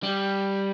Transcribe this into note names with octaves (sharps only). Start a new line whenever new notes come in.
G3